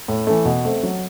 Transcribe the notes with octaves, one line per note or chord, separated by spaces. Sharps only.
A2
E3 A3
B2
A3 C4
F#3